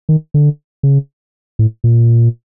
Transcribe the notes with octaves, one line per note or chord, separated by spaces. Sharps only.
D#3
D3
C#3
A2
A#2